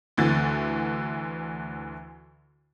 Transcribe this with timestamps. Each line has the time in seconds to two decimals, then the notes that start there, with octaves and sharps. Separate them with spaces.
0.17 D2 D3 E3 A6